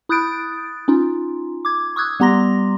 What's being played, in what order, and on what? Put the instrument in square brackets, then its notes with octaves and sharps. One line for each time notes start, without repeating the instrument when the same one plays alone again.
[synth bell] E4 D#6 F#6 G6 A6 D7
C#4 D#4 F4
D6 G#6
C#6 D#6 E6 F#6 G#6
G3 B3 G4 A#5 C6 A#6